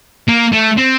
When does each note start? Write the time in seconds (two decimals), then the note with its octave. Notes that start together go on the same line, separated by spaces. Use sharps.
0.29 A#3
0.53 A3
0.78 C4